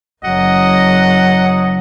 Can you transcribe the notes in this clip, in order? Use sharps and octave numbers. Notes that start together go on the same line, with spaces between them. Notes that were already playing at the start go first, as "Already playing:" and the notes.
F#1 F#3 D#5 F#5